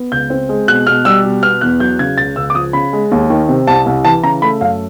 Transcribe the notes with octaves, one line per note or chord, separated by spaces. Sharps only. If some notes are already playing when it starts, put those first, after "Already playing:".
Already playing: B3
C#2 G6
C4
G#3
B2 F#6
B2 F6
G3 E6
B2
B3 F6
E2 F#6
F#3 G6
C#3 G#6
C#2 A6
C#2 E6
D6
F3 D#6
C#3 B5
G#3
D#2
D#3
C3
C2 A5
C2
E3 A5
C#3 A#5
A3 B5
F#2 F5